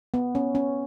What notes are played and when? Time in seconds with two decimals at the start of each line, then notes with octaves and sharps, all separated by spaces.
0.14 B3
0.35 C#4
0.55 C#4